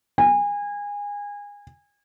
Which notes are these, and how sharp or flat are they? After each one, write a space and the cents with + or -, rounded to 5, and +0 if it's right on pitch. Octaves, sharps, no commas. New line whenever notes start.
G#5 -25